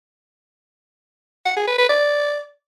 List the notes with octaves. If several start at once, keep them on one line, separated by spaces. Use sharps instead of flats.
F#5
G#4
B4
B4
D5